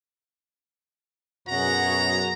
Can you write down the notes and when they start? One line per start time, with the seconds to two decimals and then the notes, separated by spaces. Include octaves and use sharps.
1.49 F#2 B2 F#4 G#4 A#5